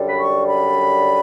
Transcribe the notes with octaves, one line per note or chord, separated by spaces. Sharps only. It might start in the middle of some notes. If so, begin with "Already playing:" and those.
Already playing: F#2 D3 G3
B5
C#6
B5